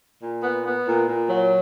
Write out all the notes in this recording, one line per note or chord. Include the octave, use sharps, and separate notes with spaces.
A#2
B3
B3
A#2
A#2
F#3